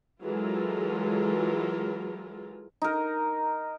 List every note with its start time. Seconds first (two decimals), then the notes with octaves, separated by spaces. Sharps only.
0.23 E3 F#3 G#3 F4 A4 A#4
2.82 D#4 A#4